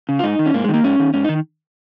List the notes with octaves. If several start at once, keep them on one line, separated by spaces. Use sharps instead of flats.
C#3
F4
G#2 D#4
D#3
C#4
G#2 A#3
G#3
D#3
A#3
G#2 C#4
D#3
G#2 C#4
D#4
D#3